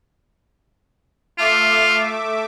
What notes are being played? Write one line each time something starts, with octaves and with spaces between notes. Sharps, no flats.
A3 F4 E5 D6